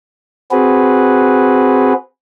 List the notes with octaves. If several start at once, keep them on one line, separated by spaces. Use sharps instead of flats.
C4 F#4 G#4 B4